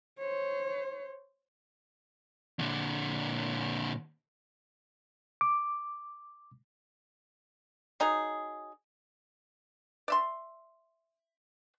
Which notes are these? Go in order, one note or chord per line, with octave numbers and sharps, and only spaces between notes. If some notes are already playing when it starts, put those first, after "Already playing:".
C5 C#5
A#2 D3
D6
F#3 D#4 G#4
D5 E5 C6